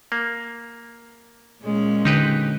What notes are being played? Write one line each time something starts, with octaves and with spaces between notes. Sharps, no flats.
A#3
A#2 G#3 C#4
D3 D#4 G4 B4